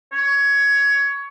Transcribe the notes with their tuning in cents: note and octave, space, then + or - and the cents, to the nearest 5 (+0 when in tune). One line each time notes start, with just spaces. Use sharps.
C#5 +15